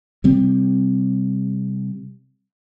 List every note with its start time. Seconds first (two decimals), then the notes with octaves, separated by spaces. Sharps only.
0.24 C3 G3 C4